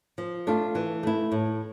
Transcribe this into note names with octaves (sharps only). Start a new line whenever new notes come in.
F3
A3 D4 F4
E3
A3 E4
A2